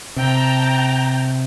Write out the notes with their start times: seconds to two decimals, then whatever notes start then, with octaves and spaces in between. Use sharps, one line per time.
0.16 C3 G5 A5 A#5